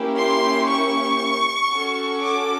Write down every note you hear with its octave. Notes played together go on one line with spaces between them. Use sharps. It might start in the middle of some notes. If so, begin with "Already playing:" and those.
Already playing: A#3 C#4 E4 G4
C6
C#6
C#4 F#4 A4
D6